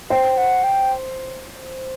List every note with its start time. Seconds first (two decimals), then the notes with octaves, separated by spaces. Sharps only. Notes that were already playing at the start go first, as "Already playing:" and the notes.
0.10 C5 G5
0.37 F#5
0.64 G5